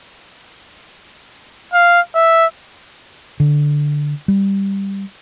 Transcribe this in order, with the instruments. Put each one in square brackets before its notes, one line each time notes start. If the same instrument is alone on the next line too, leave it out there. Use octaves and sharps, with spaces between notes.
[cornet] F5
E5
[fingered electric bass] D3
G3